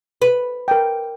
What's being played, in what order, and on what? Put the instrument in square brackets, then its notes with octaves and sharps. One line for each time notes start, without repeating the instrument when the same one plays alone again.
[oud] B4
[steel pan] A#4 G5